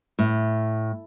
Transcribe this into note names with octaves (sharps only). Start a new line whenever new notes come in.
A2